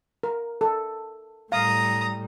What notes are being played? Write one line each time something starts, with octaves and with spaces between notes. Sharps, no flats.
A#4
A4
A2 G3 F5 A#5 D#6